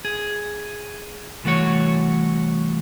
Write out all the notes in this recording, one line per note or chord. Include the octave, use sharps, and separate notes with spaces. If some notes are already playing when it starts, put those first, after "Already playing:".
G#4
C2 E3 A3 F#4 C#5